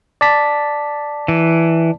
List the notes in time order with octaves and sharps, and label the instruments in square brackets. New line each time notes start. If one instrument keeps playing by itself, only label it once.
[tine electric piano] D5 A5 B6
[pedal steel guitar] E3